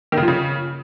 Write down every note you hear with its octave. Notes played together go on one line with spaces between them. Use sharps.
D#3
C#3
F3
C#3